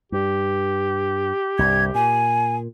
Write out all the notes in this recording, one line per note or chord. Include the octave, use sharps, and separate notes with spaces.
G2 G4
C2 G2 G#6
A#2 G#5